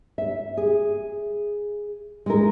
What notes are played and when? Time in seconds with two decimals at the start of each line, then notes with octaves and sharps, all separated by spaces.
0.18 E5
0.57 G#4
2.26 G#3 E4 A#4